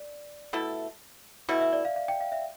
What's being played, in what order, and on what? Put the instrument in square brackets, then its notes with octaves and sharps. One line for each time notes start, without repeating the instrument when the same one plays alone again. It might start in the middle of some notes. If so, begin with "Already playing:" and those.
Already playing: [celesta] D5
[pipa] B2 A3 E4 A4
[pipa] B2 A3 E4 [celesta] E5
[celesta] E5
D5
F5
F5
G5
F5
E5